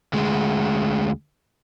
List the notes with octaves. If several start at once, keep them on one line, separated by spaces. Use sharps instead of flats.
D2 G#3